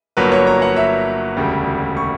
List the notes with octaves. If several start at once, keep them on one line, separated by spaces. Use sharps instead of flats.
G1 G2 F#3 A#3 B4
C#5
A#5
F#5
E5
E1 D2 C#3 G3
C#6